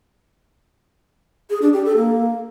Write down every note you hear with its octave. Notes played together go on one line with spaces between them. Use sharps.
G#4
D4
G4
A4
A#3